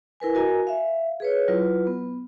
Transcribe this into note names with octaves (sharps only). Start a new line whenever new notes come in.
E4 A#4 B4 G#5
F#4 A#4 D#5 G#5 A#5
E5 F5
G#4 B4 C#5
F#3 E4 F4 B4
B3